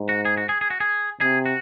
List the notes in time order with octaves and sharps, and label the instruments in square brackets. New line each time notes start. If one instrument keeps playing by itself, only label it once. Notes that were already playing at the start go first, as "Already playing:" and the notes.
Already playing: [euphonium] G#2
[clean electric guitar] F#4
G#4
F#4
G#4
G#4
F#4
G#4
[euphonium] C3 [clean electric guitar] G#4
[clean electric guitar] F#4